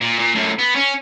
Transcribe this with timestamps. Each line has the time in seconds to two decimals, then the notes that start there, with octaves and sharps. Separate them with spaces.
0.01 A#2
0.19 A#2
0.35 F#2 A2
0.59 B3
0.75 C#4